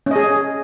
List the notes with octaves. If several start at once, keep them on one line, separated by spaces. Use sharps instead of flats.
C#4 G#4 D#5